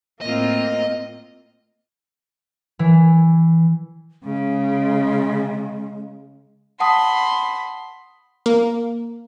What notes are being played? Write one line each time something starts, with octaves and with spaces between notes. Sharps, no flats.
A2 A#3 C4 F4 D#5
E3
C#3 G#3
F#5 A5 B5 C6 D#6
A#3